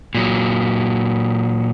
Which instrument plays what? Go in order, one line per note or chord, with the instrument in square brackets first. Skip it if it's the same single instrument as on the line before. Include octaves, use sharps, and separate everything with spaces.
[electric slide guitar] A#2 F#3